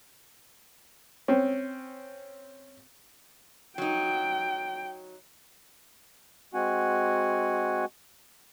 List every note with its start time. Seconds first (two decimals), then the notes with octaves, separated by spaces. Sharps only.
1.28 C4 C#4
3.78 F#3 D#4 G5
6.54 G#3 C4 F#4 F#5 G#5